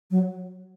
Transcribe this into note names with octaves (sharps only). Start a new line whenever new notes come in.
F#3